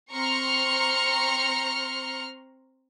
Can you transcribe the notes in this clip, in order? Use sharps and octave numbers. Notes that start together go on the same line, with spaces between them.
C4 A#5 C6 C#6 F6 C#7